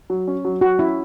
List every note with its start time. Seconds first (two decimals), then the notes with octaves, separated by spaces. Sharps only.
0.10 F#3
0.27 C#4
0.45 F#3
0.61 F#3 F#4
0.79 C#4 E4